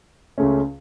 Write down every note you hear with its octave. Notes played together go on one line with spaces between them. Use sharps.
C#2 C#3 A3 C#4